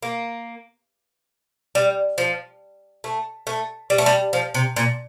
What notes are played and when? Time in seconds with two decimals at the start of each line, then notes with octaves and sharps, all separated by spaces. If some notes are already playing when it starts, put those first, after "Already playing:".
0.03 A#3
1.75 G3
2.18 F3
3.04 A3
3.47 A3
3.90 G3
3.98 A3
4.06 G3
4.33 F3
4.54 C3
4.76 A#2